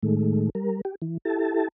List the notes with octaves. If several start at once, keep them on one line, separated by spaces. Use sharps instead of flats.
A2 D#3 G#3 A3
G3 A#4
G4
E3
E4 G4 A4 A5